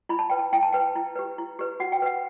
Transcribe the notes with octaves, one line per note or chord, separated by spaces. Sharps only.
E4 B5
A5
B4 G5
A5
E4 G5
A5
B4 G5
E4
G4 B4
E4
G4 B4
F#4 F#5
G5
B4 F#5